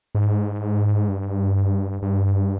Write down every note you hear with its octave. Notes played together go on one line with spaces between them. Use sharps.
G#2
G2
G2